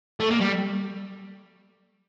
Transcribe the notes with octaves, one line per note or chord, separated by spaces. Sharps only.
A3
A#3
G3